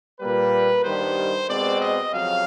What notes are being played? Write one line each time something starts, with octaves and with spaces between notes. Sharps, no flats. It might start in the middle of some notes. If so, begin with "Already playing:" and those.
A#2 G3 A#3 B4
G2 D#3 G3 B3 C5
B2 G#3 C4 D5
D#5
F2 C#3 F#3 F5